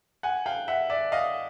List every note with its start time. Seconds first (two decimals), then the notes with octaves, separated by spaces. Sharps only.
0.23 F#5 G#5
0.46 F5 G5
0.68 E5 F#5
0.90 D5 E5
1.12 D#5 F5